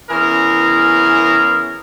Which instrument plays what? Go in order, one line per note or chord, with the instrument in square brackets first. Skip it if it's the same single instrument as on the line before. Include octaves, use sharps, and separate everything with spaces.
[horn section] E3 B3 C#4 E4 G#4 A#4